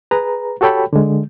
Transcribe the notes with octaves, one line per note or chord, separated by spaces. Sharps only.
G#4 B4 A#5
F#4 G4 A4 C#5 G5 B5
D3 G#3